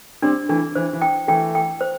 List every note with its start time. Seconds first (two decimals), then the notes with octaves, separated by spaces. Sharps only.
0.22 G3 C4 D4
0.49 E3 A3 D4
0.75 E3 C5
0.93 E3
1.02 G5
1.28 E3 A3 G5
1.55 G5
1.81 C5